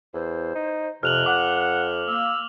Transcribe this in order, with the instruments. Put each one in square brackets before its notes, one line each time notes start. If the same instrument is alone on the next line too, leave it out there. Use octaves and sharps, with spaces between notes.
[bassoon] E2 [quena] C5
[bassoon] D#4
[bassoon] F2 [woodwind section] C3 [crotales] F6 F7 F#7 [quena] F#6
[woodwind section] F#5 [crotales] D6
[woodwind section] A#3 [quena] E6